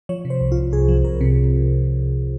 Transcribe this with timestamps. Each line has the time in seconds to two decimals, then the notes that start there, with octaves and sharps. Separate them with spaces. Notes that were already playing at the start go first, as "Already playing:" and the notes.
0.09 F3 C#5
0.25 C3
0.30 C5
0.41 C2
0.52 F4
0.57 C2
0.72 C2 G#4
0.88 F3
1.04 C2 A#4
1.21 C3